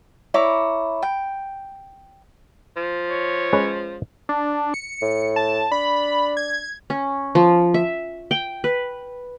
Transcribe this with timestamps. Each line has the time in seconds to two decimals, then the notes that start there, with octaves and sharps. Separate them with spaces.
0.34 E4 C#5 A#5 D6
1.03 G5
2.76 F3
3.11 C#5
3.53 G#3 C#4 B4
4.29 D4
4.74 C#7
5.02 A2
5.36 A5
5.72 D4 B5
6.37 G#6
6.90 C#4
7.35 F3
7.74 E5
8.31 G5
8.64 B4